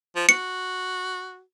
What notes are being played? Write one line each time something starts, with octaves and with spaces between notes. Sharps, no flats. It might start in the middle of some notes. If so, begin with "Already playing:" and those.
F3
F#4 C#7